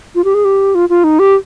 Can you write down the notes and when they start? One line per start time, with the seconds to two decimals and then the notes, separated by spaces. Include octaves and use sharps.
0.15 F4
0.24 G4
0.34 G#4
0.45 G4
0.75 F4
0.89 F4
1.04 D#4
1.19 G4